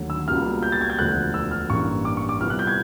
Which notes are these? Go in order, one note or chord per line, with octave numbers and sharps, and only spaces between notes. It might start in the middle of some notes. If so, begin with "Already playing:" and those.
Already playing: D#2 D3 F#3 A3
E6
C#2 B2 G3 A#3 F6
G6
A6
G#6
G6
E1 D2 D3 F3 A3 F#6
E6
F6
A1 G2 E3 G3 A#3 C#6
D6
C#6
D6
C2 A#2 G3 B3 F6
F#6
G6
G#6